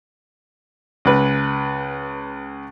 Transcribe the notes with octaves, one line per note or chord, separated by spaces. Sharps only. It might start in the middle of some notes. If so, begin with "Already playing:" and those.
C#2 B4